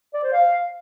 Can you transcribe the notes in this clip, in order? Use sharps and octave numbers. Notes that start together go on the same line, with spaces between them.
D5
C5
F5